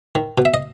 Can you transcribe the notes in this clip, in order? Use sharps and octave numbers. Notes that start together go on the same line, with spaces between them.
D#3
B2
E5
D#5